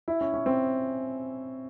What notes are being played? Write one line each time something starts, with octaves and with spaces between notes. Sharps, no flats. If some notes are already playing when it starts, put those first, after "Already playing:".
E4
C#4
C#4
C4